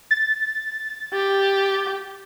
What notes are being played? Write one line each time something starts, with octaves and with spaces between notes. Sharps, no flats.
A6
G4